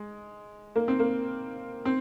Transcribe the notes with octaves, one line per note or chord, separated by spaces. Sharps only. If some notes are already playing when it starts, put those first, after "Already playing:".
Already playing: G#3
A#3
C4
A#3
C4